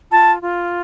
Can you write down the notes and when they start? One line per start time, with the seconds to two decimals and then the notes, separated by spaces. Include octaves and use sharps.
0.11 F4 A5
0.43 F4